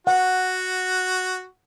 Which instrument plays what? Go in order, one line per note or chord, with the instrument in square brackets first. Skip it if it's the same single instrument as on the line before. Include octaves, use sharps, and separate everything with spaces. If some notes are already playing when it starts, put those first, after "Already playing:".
[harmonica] F#4 [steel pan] F#5